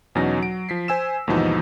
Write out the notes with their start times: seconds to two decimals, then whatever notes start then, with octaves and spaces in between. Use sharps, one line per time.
0.15 E2 B2 F#3 C#4 D#4 A#6
0.38 F#3 D7
0.69 F3 B6 C7
0.88 C5 G#5 E6 E7
1.27 D#2 G#2 B2 E3 F3 D#4